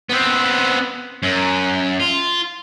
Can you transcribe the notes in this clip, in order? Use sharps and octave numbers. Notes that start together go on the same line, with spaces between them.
B3 C4
F#2
F4